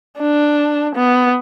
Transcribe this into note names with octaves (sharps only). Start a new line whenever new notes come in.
D4
B3